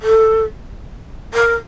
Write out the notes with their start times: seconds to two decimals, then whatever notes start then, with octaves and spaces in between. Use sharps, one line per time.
0.02 A4
1.34 A#4